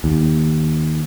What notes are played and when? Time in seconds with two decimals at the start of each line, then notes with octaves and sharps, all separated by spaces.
0.04 D#2